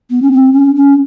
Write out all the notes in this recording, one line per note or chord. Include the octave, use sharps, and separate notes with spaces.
B3
C#4
C4
C#4
C#4